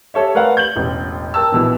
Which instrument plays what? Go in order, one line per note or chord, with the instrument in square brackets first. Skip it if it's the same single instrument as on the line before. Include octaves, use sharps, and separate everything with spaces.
[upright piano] G4 A4 C#5 E5
A3 A#4 B4 D5 F5 F#5
G6 F#7
E1 A1
A#4 G5 A5 E6
A#1 B2 E3